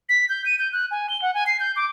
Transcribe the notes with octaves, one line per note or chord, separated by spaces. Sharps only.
B6
G6
D#7
G6
F#6
G#5
G7
F#5
G#5
C7
G6
D6